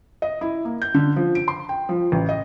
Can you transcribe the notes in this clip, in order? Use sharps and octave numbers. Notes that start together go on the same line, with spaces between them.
D#5
E4
A#3
G6
D3
F3
D7
C6
G5
F3
A1
D#5